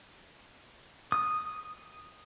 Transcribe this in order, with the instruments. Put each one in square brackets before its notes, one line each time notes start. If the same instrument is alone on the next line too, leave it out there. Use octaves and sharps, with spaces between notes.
[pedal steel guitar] D#6